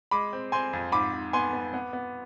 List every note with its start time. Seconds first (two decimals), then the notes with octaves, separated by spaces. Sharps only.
0.11 G#3 B5 D6
0.33 C4
0.52 C4 G#5 C6
0.73 F2
0.92 G#2 B5 D6
1.13 G#2
1.33 B3 G#5 C6
1.53 B3
1.74 B3
1.93 B3